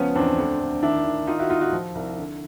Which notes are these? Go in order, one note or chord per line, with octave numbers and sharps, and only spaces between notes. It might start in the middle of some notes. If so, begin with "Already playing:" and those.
Already playing: C#2 F3 B3 C#4
E2 C4 D4
D2
D2
D#3 D4 E4
D#3
D#3 D#4 F4
E4 F#4
D#2 D#4 F4
E4 F#4
F3
C2
D3